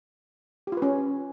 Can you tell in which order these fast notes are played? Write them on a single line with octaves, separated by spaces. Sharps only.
G4 F4 B4 C#4